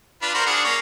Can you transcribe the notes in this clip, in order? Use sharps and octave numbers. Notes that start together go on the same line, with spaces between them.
D4 F4 B4
F#4 A#4 C5
D4 G#4 F#5
A#3 C#4 C#5